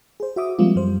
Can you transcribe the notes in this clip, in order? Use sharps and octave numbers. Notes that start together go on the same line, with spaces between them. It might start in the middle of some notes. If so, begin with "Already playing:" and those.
G#4 C5
F#4 E5 D6 D#6
F3 G3 G#3 A#3 C4 F4
F#2 G3 C5